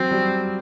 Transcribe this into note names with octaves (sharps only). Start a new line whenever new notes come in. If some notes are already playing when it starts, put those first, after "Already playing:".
Already playing: F#3 C4
G3